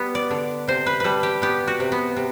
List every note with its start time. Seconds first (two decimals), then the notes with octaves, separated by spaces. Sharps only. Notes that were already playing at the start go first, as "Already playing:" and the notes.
Already playing: G3 B3
0.15 D5
0.31 D3
0.68 C3 C5
0.86 B4
1.00 G3 A4 B4
1.23 G4
1.42 B3 G4
1.67 F#4
1.80 C3
1.92 B3
2.17 C3